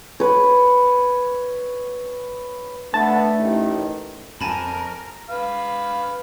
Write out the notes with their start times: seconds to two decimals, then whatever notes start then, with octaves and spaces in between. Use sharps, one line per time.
0.20 B4 C#5
2.94 D3 A3 B3 A5
3.38 A1 D#3 D#4
4.41 F2 A#4 G#5 A5 B5
5.29 B4 F5